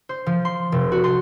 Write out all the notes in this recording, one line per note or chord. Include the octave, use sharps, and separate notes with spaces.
C5
F3
C6
F1
F#4
C6